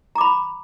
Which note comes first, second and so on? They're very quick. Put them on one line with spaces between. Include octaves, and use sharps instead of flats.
A#5 D6 B5